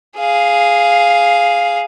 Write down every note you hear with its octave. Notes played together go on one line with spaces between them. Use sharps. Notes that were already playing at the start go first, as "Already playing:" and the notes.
G#4 F5